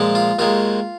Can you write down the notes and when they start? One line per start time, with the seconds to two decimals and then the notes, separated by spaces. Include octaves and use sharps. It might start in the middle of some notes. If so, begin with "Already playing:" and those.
Already playing: A#2 F3 G#3
0.15 F4
0.39 D#2 D#3 G#3 F4